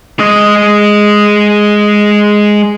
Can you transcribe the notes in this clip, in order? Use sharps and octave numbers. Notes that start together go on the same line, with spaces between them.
G#3 D#5